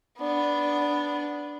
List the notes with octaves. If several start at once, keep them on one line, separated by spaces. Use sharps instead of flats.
B3 D4